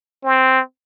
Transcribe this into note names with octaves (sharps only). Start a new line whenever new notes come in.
C4